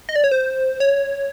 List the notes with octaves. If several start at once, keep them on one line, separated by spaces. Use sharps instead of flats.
D#5
D5
C#5
C5
C#5